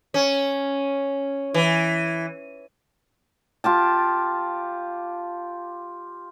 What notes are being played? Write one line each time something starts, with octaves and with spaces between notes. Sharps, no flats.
C#4
E3
F4 G4 A5